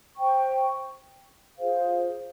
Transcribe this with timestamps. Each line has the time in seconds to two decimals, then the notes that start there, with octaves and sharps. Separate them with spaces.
0.17 C5 G5 C#6
1.58 F4 G#4 C5 F5